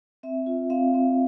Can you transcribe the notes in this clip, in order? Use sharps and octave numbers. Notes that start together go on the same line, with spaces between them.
C4 E5
F4
C4 F5
C4